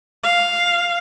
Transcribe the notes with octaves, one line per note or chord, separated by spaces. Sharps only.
F5